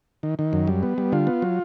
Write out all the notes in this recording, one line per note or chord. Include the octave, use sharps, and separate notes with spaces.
D#3
D#3
F#2
G3
B3
G3
D3 F4
B3
F#3